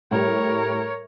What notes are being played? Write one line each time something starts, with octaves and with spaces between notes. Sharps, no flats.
A2 G3 A#4 C#5